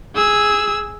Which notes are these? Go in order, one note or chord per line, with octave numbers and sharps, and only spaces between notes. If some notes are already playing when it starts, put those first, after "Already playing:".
G#4 E6